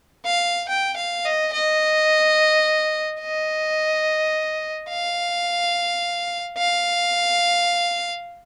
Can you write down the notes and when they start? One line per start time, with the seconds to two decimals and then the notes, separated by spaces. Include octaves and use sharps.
0.26 F5
0.69 G5
0.97 F5
1.25 D#5
1.53 D#5
3.21 D#5
4.90 F5
6.58 F5